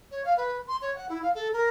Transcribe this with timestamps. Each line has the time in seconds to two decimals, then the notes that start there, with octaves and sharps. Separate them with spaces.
0.11 C#5
0.25 F5
0.37 B4
0.67 C6
0.82 C#5
0.95 F#5
1.09 E4
1.22 F5
1.35 A4
1.53 A#4